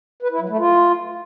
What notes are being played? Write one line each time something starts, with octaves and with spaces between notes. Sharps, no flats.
B4
E4
F#3
A3
F4